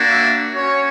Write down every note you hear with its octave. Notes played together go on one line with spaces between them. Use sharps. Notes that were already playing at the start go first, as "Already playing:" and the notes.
Already playing: A#3 D4 F#4
E5
C#4 F#4 C#5